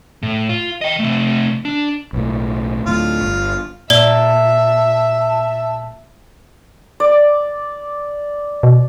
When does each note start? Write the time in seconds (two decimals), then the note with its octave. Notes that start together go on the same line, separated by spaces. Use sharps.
0.23 A2
0.49 F4
0.81 D#5 G5
1.00 C3 A3
1.65 D4
2.13 B1 A2
2.86 D2 A2 F4
3.22 G1
3.90 A#2 D5 E5 A5 G7
7.00 D5
8.63 B2